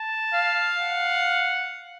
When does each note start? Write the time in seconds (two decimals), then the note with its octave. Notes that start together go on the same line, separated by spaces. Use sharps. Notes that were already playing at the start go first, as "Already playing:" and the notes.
Already playing: A5
0.33 F5
0.81 F#5